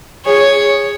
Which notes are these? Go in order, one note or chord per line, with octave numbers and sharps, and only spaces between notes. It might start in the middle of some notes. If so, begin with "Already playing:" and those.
G#4 C#5